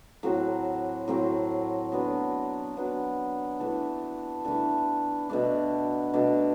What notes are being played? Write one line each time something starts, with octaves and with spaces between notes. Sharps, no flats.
A2 F#3 C4 F#4
A2 F#3 C4 F#4
F#3 B3 D4
F#3 B3 D4
E3 A3 D4 A4
E3 A3 D4 A4
B2 A3 D4
B2 A3 D4